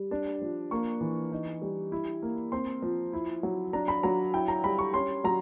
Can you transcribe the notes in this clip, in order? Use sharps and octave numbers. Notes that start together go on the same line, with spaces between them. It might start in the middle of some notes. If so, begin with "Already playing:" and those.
Already playing: G3
D4
F3
A#3 C#6
E3
D#4
G3
E4
A#3
C4 C6
F3
E4
F#3
D4 A#5
B5
F#3 A#5
E4 G5
A#5
G3 B5
C#6
C#4 C6
F#3 A#5